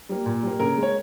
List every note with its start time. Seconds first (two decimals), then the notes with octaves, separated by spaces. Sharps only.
0.09 G3 A#3
0.26 A#2
0.43 G3 A#3
0.60 C#3 A#4
0.78 G#3
0.83 C#5